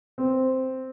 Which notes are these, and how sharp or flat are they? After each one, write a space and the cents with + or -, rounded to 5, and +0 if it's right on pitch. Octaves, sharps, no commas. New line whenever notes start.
C4 -5